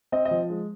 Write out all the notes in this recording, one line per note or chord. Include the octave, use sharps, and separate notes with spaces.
C4 D#5
D#5
F3
G#3